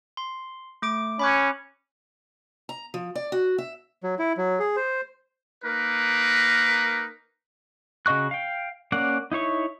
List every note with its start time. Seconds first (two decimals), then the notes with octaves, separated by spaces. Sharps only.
0.17 C6
0.82 A3 D6 D7
1.19 C#4 B5 D6 F#6
2.69 A#5
2.94 F3
3.15 D5
3.32 F#4
3.58 E5
4.03 F#3
4.19 E4
4.37 F#3
4.59 G#4
4.76 C5
5.64 A#3 D#4 A#4 B4
8.06 C#3 F#4 D#5 C#6 F#6
8.31 F5 G5
8.92 A#3 C#4 D5 F#5
9.32 D#4 E4 C#5 C#6